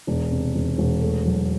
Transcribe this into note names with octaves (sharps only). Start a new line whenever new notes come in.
E1
C3
E1
E1
A3
F#3